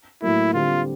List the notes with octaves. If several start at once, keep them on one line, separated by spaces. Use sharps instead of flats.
A2 F#3 A#3 E4
D3 G3 C4 F4